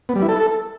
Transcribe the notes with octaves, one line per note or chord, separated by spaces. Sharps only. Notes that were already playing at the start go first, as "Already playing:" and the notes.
B3
G3
E4
A4